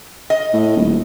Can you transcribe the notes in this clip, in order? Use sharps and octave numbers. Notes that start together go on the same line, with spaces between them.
D#5
A2
D#1